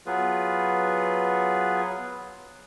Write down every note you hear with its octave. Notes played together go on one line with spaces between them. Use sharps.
F#3 B3 F4 G#4 B4